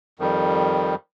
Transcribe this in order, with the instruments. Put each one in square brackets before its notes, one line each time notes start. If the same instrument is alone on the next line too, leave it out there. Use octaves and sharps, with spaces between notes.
[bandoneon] F2 D#3 G3